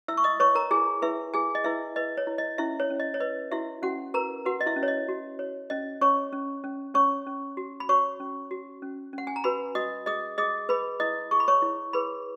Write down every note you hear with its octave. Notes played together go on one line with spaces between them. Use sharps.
E4 E5 E6
C#6
D#5 D#6
B4 C#5 C#6
A#4 A#5
E4 G#4 G#5
E4 B4 E5
E4 G#4 G#5
D#5
E4 B4 E5
B4 D#5
C#5
E4
D#5
C#4 E4 E5
C#5
C#4
D#5
C#5
B4 D#5
E4 F#4 E5
C#4 F#4 F#5
A#4 B4 A#5
F#4 B4 F#5
D#5
E4 E5
C#4
C#5
D#5
F#4
C#5
C#4 D#5
C#4 C#5 C#6
C#4
C#4
C#4 C#5 C#6
C#4
F#4
B5
F#4 C#5 C#6
C#4
F#4
C#4
C#4
F#5
G#5
A#5
F#4 B4 B5
F#4 D#5 D#6
G#4 D#5 D#6
G#4 D#5 D#6
G#4 B4 B5
E4 D#5 D#6
G#4 C#6
B5
C#5 C#6
E4
G#4 B4 B5